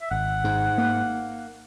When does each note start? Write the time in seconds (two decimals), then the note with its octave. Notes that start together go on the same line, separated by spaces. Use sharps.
0.02 E5
0.11 G#1 F#5
0.44 G#2
0.78 A#3